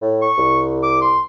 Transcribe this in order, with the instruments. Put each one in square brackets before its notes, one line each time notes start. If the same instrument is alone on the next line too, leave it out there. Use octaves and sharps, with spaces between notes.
[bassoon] A2
[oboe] C#6
[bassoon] C2
[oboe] D6
C6